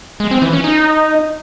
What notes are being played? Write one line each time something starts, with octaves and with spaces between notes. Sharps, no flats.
G#3
C4
E3
C#4
D#4